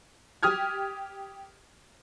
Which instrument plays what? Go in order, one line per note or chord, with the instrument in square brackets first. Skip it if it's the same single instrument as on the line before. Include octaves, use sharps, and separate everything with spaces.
[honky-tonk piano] G4 D#6 F6 G#6